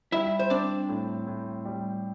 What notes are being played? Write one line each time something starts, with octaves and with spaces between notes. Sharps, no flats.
G3 E4 E5
C5
C4 D4 D5
A2
A2
G3